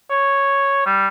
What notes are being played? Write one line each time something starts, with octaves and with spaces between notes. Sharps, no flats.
C#5
G3